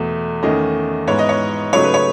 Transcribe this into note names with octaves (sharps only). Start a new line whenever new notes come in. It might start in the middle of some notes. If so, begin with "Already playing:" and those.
Already playing: E2 B2 A3
E2 D#3 A3 C#4 D#5
G#2 E3 B3 C#5
D#5
C#5
C#3 F#3 A3 D#4 C#5
B4
C#5